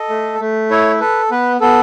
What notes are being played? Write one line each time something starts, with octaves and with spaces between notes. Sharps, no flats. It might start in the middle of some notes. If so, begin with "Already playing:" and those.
Already playing: A4 D#5
A3
A3
E4 C#5
A4 B4
B3 B4
B3 A4